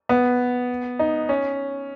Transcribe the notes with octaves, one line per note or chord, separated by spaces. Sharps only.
B3
D#4
C#4